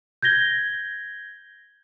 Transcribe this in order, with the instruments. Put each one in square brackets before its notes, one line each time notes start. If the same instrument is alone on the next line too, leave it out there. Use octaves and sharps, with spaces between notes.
[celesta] G6 G#6 A#6 G7